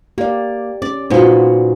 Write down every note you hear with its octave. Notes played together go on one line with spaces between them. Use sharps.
A#3 G4 D5
C#4 D5
A#2 B3 D#4 F4 F#4 C5